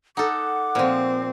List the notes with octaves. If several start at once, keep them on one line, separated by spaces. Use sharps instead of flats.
D#4 A4 F#5 D6
A#2 F3 C4